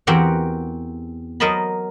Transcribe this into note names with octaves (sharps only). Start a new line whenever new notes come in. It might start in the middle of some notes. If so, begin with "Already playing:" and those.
E2 C4 F#4 G4 A#4 F#5
F#3 A#4 C5 D#5 A5 B5